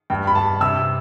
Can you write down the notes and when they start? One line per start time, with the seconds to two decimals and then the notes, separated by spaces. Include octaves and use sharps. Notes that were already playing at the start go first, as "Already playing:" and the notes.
0.10 G2 G5
0.27 B5
0.35 G2 A5
0.61 C3 E6